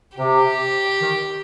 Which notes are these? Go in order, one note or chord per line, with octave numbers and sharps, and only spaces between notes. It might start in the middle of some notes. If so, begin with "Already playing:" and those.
C3 G4
D#3